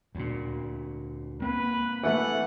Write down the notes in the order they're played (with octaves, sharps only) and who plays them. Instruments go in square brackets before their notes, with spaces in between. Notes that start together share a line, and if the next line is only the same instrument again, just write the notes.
[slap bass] D2 A#2
[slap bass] A#3 C4 [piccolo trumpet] B4
[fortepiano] E3 A3 [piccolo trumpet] F#5